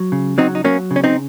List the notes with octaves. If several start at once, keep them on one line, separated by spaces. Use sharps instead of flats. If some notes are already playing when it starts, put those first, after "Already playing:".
Already playing: F#3
C#3
F#3 C4 D#4
D#4
F#3 A#3 C#4
C#3
C#4
C4 D#4